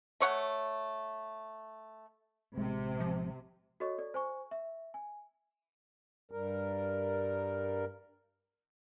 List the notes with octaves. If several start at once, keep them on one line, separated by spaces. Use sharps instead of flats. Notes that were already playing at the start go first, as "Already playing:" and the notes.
A3 C#5 F#5
A1 C3 G#3
F3
F#4 A4 C#5 D#5 C#6
A4 D5
C5 G#5 C#6
E5
G#5
G2 G3 A#4